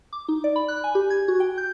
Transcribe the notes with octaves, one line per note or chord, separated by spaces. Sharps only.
D6
D#4
D5
B5
F#6
G#5
G4
G#6
F#4
G5
G6